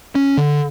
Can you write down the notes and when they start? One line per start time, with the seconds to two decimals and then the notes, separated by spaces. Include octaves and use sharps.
0.15 C#4
0.37 D3